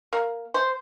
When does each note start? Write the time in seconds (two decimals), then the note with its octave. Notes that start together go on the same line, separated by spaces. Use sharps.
0.13 A#3
0.54 C5